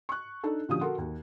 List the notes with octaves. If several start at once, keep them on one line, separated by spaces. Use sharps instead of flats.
C#6 F#6
D4 D#4 A4
A#2 D3 F3 C#4 G4 D#6
F#4 A4 A#4 F#5 C6
D#2